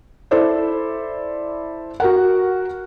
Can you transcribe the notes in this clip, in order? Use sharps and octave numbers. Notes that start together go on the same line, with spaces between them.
E4 A4 C5 D5
F#4 A#4 F#5